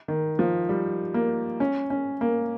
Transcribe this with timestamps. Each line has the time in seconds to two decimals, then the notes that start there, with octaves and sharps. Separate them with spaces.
0.08 D#3
0.39 F3
0.69 G3
1.14 A#3
1.60 C#4
1.90 C#4
2.21 A#3